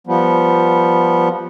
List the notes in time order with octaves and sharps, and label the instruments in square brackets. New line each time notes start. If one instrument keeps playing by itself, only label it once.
[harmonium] F3 G3 B3